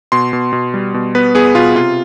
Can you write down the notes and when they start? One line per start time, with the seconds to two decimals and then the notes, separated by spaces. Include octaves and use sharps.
0.12 B2 C6
0.33 B2
0.53 B2
0.74 G3
0.94 B2
1.15 B3 B4
1.35 B3 G#4
1.55 B2 F4
1.75 C3 F4